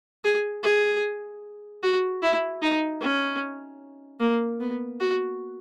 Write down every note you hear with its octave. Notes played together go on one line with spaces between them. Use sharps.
G#4
G#4
F#4
E4
D#4
C#4
A#3
B3
F#4